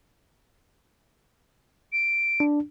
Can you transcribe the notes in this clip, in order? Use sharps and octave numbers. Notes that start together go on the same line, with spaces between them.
D7
D4